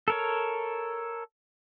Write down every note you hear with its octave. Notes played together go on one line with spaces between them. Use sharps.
A4 A#4 C#5